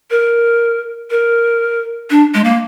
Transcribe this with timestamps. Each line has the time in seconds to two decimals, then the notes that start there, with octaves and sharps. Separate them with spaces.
0.11 A#4
1.11 A#4
2.10 D4
2.34 G#3
2.44 A#3